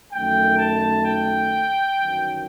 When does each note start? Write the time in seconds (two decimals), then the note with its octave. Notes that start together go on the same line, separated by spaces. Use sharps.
0.12 F#2 D#3 A3 G5
0.58 A5
1.03 G5
1.95 G1 F#2 D#3